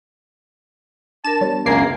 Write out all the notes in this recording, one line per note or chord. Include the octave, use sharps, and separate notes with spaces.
D4 A#4 A5 E7
G3 B3 C#5
C#2 F#2 A#3 G#5 D6 G#6 C7